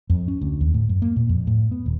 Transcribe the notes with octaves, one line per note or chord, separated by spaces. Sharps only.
F2
C#4
D2
D#2
A2
F#2
A#3
A#2
F2
A2
B3
D#1